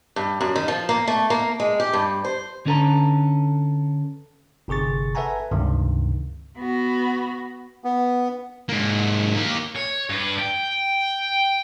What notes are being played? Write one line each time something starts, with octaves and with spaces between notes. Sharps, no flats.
G2
F#2
D#3
F3
A#3
A3
A#3
G#3
G4
G2
C5
D3 C#4 D4 A4 B4 A#5
G1 C3 G#4 C#6 A6
A4 B4 E5 F#5 G#5 A#5
C#2 G2 C3 D#3
B3 F#4
B3
G#2 A#3
A#3 G4
C#5
G2 B4
G5